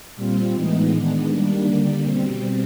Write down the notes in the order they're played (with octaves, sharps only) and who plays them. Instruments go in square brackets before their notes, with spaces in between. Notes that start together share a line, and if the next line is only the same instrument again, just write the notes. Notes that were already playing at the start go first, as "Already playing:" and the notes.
[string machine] A#2 G3 C4 F4
A2 E3 G#3 B3 D#4
D#3 G#3 B3 D4
D#3 G3 A#3 D4
D3 G3 A#3
B2 G3 C4